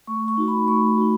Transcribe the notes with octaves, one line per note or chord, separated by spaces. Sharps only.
A3 C#6
C#6
D#4 F#4
B5
A3 C#6
D#4 F#4